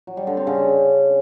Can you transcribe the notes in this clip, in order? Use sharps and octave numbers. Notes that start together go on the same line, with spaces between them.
F#3
G3
D3
C4
C#3